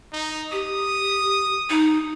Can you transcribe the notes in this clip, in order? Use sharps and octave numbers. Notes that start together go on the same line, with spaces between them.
D#4
G4 D#6
D#4